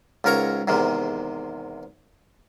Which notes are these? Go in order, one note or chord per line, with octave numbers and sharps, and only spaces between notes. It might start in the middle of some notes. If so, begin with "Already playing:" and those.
C#2 G#2 A#4 C#5 A#5
E2 G#2 C3 D#3